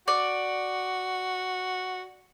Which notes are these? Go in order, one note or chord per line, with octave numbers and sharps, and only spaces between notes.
F#4 D5